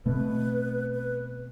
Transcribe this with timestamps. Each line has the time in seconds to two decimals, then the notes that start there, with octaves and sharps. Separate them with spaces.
0.06 B2 A3 C4 B4
0.94 B4